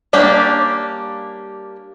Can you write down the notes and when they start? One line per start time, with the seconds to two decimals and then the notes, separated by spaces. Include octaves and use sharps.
0.13 G3 A#3 C#4 D4 G4